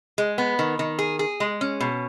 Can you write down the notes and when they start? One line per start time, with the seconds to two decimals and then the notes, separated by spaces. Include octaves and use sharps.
0.18 G#3
0.38 B3
0.59 D#3
0.79 D#3
0.99 G#4
1.19 G#4
1.40 G#3
1.61 C#4
1.80 B2